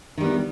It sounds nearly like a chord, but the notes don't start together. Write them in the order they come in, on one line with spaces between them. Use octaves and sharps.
D#3 G3 B3